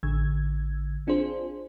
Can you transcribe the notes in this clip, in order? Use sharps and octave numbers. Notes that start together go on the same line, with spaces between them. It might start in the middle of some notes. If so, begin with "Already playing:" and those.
A1 D3 E6 G#6
C4 D4 F4 G#4 C5